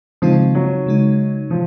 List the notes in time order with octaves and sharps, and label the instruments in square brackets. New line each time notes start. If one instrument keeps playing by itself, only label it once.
[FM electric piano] C#3 G#3 C4 D#4 [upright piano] F3
[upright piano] F#3
[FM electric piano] C#3 G#3 D#4
[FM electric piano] C3 [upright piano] F3